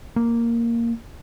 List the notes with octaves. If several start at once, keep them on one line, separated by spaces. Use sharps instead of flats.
A#3